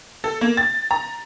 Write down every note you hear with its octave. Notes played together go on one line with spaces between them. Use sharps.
A4
A#3
A6
A#5